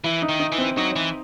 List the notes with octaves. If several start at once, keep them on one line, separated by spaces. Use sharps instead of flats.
E3 E4
D#4
D#3
D#4
E3
C4
F#3 D#4
E3